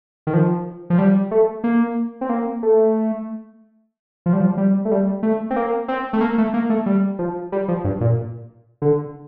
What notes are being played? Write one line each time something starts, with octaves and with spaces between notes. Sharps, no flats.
D#3
F3
F3
G3
A3
A#3
C4
A#3
A3
F3
G3
F3
G3
A3
G3
A3
C4
A#3
C4
A3
A#3
A3
A#3
A3
G3
F3
G3
F3
G2
A#2
D3